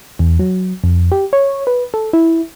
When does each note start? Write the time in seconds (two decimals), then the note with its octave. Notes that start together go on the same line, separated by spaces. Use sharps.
0.19 E2
0.39 F#3
0.84 F2
1.12 G4
1.33 C#5
1.67 B4
1.94 A4
2.13 E4